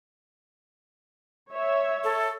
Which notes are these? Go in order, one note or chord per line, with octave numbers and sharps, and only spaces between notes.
C#5 E5
A4